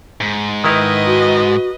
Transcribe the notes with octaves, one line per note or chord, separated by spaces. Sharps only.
G#2
D#3 E4 B4 D#5 A#5
F#4